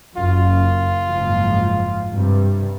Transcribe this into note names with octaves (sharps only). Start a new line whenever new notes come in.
F#1 F#2 F4
F#1 G#2 F3
G2 C3 G3